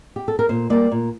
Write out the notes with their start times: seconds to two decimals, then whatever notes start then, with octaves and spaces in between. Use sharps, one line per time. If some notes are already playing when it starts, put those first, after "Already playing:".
0.16 G4
0.28 A4
0.39 A#4
0.49 A#2 C5
0.70 G3 A#3 D5
0.92 A#2